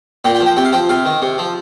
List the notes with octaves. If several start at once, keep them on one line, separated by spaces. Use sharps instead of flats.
A#2 G5
G5
F3
G5
C3 G5
F5
F3 G5
C3 F5
D#3
C3
F3